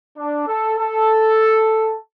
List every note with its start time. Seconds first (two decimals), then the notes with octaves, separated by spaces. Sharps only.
0.17 D4
0.47 A4
0.78 A4